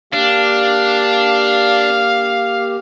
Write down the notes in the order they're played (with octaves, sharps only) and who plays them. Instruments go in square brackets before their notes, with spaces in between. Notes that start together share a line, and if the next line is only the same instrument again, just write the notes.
[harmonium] A#3 G4 [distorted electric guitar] D4 [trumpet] F5